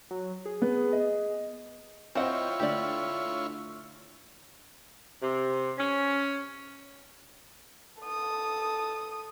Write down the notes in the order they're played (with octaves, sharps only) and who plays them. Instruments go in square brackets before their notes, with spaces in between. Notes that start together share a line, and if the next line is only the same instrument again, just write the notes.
[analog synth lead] F#3
G#4
[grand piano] B3
D#5
[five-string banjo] C4 F#5 [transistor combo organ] E4 F4 C#5 [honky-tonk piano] C5 D#5 G5
[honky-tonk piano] D3 A3 D4 [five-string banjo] G4 D5
[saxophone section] C3
C#4
[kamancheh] A4 D#6